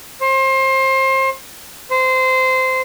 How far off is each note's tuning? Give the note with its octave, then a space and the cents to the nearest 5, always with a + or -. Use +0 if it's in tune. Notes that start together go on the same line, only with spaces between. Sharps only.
C5 +30
C5 -15